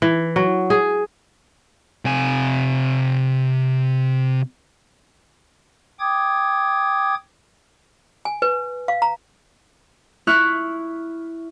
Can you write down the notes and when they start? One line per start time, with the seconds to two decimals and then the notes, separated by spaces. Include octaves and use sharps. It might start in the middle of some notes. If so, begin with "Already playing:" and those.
0.02 E3
0.36 F#3
0.70 G#4
2.05 C3 G#5
6.00 G5 D6 D#6 G#6
8.25 G#5
8.42 B4
8.88 F5
9.02 A#5
10.27 E4 E5 C#6 F6 F#6